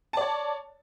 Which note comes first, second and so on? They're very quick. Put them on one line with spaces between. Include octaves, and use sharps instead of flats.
A5 D5 C#5